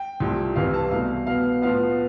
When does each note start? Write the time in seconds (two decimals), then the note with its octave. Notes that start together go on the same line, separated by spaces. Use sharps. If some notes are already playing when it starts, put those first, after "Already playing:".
Already playing: G5
0.20 C2 C3 F3 A3
0.56 C2 C3 E3 F5
0.74 A5
0.91 C2 B2 A3 F5
1.27 B2 B3 F5
1.62 A2 F3 B3 F5